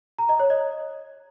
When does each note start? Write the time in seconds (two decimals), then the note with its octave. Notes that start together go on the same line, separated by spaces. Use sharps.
0.19 A#5
0.29 D#5
0.40 C#5
0.50 D#5